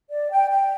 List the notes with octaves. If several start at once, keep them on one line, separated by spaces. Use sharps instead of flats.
D5
G5
G5